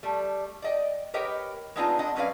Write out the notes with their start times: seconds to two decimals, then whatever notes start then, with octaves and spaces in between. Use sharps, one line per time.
0.03 G3 A3
0.62 D5 D#5 G5
1.14 G4 A#4 B4 C#5 D#5 G5
1.76 G#3 B3 C4 D4 D#4 F4
1.99 G#3 C4 D4 D#5 F#5
2.16 C3 F#3 C#4 B4 D5 F5